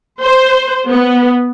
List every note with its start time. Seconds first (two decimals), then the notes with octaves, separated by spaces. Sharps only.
0.21 C5
0.90 B3